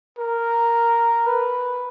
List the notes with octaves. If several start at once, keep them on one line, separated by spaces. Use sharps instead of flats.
A#4
B4